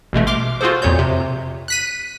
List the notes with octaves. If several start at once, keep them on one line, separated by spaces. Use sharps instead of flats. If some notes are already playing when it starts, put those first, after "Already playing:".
A1 B2 G#3 A3
C6 D6 F6
F4 F#4 G#4 A4 C5
F2 A#2 C#5 G6
C3
F#6 B6 D#7